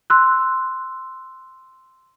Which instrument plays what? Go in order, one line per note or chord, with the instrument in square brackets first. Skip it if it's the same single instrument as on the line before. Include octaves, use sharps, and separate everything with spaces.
[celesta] C6 E6 F#6